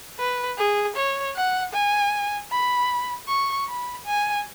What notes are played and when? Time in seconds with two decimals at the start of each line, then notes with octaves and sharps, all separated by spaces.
0.19 B4
0.58 G#4
0.96 C#5
1.36 F#5
1.73 G#5
2.51 B5
3.29 C#6
3.68 B5
4.06 G#5